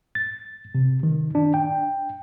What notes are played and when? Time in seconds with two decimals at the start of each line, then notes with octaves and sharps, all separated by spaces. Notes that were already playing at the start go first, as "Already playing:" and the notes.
0.15 A6
0.75 C3
1.03 D#3
1.35 D4
1.54 G5